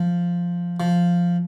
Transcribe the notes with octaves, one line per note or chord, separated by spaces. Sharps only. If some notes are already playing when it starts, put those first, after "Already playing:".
Already playing: F3
F3